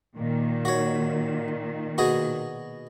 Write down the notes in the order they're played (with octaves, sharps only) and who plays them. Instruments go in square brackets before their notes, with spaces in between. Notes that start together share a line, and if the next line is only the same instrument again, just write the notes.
[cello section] A#2 D#3
[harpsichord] F#4 C#5
B2 F#4 G#4